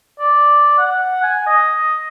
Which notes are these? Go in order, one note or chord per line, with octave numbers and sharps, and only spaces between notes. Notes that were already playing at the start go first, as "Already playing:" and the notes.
D5
F#5
G#5
D#5